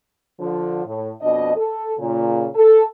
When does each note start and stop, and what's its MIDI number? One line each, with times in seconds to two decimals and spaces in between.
0.40 0.82 50
0.40 0.82 53
0.86 1.11 45
1.22 1.52 41
1.22 1.52 47
1.22 1.52 62
1.22 1.52 75
1.57 1.94 69
1.99 2.47 46
1.99 2.47 49
2.55 2.83 69